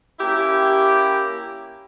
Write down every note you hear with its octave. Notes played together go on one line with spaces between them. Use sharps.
A#3 C#4 E4 G4